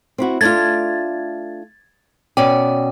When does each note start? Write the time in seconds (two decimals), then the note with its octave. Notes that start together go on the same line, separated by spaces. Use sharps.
0.18 C4 E4 F#4
0.41 A3 D4 F4 G#6 A6
2.37 B2 C#4 D5 G5